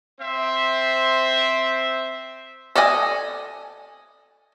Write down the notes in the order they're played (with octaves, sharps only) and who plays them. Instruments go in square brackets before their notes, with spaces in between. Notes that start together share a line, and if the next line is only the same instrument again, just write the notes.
[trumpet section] C4 C5 E5
[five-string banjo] A4 D5 D#5 G5 G#5